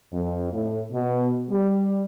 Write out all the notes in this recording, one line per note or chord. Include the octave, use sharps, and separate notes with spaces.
F2
A2
B2
G3